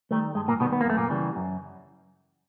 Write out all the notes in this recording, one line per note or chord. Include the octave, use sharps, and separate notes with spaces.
D#3 G3 A3
G2 G#3
A#2 A#3
B2 D#3 G3 B3
B3
A#3
F#2 A3
A#2 A#3
C#3 E3 G3
F#2